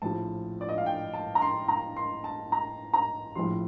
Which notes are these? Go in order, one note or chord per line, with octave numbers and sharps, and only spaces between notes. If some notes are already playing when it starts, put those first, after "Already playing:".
A#1 A2 F3 A5
D5
D#5
F5
G5
A5
A#5
C6
A#5
C6
A5
A#5
A#5
A#1 A2 F3 C6